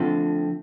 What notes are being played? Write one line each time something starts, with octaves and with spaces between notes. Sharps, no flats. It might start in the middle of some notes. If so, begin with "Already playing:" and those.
Already playing: D3 F3 A3 C4